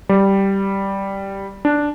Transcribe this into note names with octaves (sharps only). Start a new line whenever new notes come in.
G3
D4